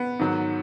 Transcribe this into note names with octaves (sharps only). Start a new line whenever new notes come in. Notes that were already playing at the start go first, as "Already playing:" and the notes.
Already playing: B3
G#2 D#3 F#3